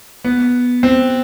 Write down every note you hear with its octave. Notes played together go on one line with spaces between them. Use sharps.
B3
C4